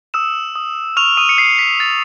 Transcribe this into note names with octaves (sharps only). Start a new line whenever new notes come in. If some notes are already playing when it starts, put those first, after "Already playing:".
D#6 E6 E7
D#6
C#6 F6 F7
D#6 D#7
C#7
F6 C7
B6
F6 A6